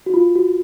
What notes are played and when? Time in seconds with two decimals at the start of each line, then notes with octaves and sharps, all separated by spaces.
0.06 F#4
0.14 F4
0.36 F#4